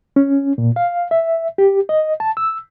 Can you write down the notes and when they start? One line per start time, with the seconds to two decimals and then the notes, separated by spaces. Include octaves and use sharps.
0.16 C#4
0.58 A#2
0.76 F5
1.11 E5
1.58 G4
1.89 D#5
2.20 A5
2.37 E6